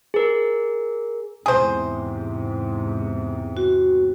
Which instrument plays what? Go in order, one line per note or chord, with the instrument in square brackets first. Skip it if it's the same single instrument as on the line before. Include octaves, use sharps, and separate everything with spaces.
[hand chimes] G#4 A#4
[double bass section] E2 G#2 C3 [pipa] G#4 C5
[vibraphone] F#4